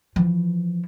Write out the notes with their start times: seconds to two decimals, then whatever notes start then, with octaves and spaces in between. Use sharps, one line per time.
0.16 E3 F3